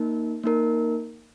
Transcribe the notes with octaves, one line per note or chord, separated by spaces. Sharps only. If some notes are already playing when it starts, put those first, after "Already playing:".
Already playing: A#3 D#4 A#4
A#3 D#4 A#4